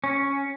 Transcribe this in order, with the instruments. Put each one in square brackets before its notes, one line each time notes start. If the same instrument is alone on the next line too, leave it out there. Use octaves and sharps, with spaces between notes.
[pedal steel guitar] C#4